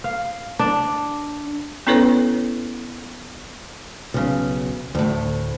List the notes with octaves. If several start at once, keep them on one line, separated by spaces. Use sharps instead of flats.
F5
D4
B3 C#4 E4 A4 B4 C#5
B1 C#3
D2 A2